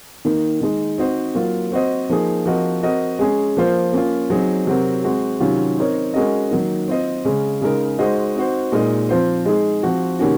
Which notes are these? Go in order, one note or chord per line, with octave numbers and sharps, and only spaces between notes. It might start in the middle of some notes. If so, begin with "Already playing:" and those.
D#3 A#3 D#4
D#3 G#3 D#4
C4 D#4 F#4 C5 D#5
F#3 A#3 F4
C4 F#4 C5 D#5
F3 A#3 D#4 G#4
F3 C4 F#4 A#4 D#5
C4 F#4 A#4 D#5
G#3 C#4 G#4
F3 A#3 F4 C5
A#3 C#4 F4
F#3 C4 D#4 G#4
C3 F#3 C4 F#4 A#4
G#3 C4 F#4
C3 D#3 F#3 C#4 F4
C4 D#4 A#4 C#5
G#3 C#4 F#4 A#4 D#5
D#3 F#3 A#3 D#4
C4 F4 C5 D#5
C#3 G#3 C#4
C#3 G#3 D#4 A#4
G#3 D#4 F#4 C5 D#5
C4 D#4 F#4 C5
A#2 G#3 D#4 A#4 D#5
F3 C4 F4 C5
G#3 D#4 G#4
F3 C4 F#4
C3 D#3 A#3 C#4 F#4